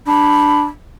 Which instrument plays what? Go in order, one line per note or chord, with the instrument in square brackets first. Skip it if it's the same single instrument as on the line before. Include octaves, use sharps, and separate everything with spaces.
[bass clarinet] D4 [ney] B5